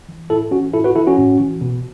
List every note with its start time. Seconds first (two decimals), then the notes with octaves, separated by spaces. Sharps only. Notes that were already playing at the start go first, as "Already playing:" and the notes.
0.09 E3
0.30 A2 E4 A4
0.51 E3 C#4 F#4
0.74 A2 E4 A4
0.84 F#4 B4
0.95 E3 E4 A4
1.07 C#4 F#4
1.18 A2
1.40 E3
1.61 B2